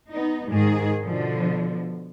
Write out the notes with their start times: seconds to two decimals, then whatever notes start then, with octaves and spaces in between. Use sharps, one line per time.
0.10 B3 D#4
0.51 G#2 D#3 G#4
1.02 B2 D3 F3